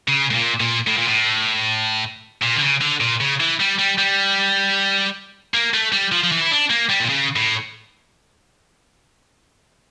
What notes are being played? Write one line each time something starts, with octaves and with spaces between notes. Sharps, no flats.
C#3
A2
A#2
A#2
A2
A#2
A2
A#2
D3
C#3
D3
A#2
C#3
E3
G3
G3
G3
A#3
A3
G3
F3
F3
E3
E4
D4
A#3
G3
A#2
C#3
A2